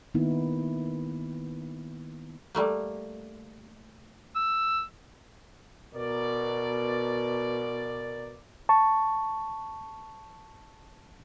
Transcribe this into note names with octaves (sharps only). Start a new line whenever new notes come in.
D#3 A#3 B3 D#4 E4
G3 A3 A#3
E6
B2 A#4 D5
A5 C#6